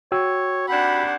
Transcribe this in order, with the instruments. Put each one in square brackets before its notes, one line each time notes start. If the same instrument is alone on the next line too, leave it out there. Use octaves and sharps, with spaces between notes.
[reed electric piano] F#4 G5 E6 [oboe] C#5
[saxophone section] D#2 C3 D4 [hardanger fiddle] F#5 [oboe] B5